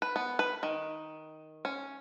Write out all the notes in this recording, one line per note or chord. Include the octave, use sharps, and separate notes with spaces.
B4
B3
B4
D#3
C#4